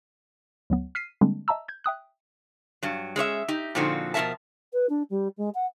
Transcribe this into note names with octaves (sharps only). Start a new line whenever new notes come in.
D2 F#3 B3
F6 B6 C7 D#7
D3 G3 G#3 A#3 C4 D4
D#5 E5 A5 A#5 E6
G6 G#6
E5 G5 D#6 F#6
G2 F#3
G#3 C#4 C#5 E5
D#4 G4
A#2 D3 F3 C4 D#4 F#4
B2 F3 D4 A#4 E5 A5
B4
D4
G3
G#3
F#5